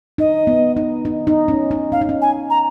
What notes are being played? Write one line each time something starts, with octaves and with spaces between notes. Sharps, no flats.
D#4 D#5
B3
D#4
D#4
D#4
C#4
D#4
C#4 F5
D#4
C#4
G#5
A#5